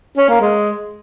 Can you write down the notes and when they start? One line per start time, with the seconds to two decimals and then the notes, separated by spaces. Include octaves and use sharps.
0.18 C#4
0.29 A#3
0.41 G#3